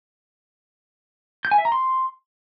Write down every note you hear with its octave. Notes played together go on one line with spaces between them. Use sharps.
G6
G#5
E5
A#5
C6